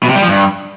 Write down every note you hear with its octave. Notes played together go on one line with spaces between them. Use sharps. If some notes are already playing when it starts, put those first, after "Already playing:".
B2
C3
G3
F3
G2